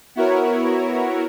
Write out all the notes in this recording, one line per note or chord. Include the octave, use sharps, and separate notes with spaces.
B3 E4 F#4 A#4 C#5